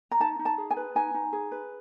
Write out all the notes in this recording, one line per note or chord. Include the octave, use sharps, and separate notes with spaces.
A#5
D#4 A5
D#4
A5
G#4
G#5
B4
D#4 G#5
D#4
G#4
B4